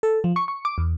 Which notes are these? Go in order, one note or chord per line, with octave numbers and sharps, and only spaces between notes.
A4
F3
C#6
C#6
D6
E2